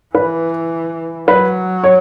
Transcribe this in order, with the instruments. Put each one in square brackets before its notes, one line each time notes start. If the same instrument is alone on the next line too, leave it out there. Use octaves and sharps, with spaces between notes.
[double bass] E3 [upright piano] B4
[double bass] F#3 [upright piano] B4
[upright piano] C#5